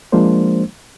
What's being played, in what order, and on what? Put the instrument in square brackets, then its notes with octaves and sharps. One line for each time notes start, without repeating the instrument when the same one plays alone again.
[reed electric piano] F3 G#3 A#3 D4 C5